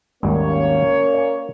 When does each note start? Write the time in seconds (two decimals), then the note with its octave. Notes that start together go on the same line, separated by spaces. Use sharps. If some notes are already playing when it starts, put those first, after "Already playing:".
0.23 G#1 D#2 G3 A#3 C#4 C#5
1.14 D5 G#5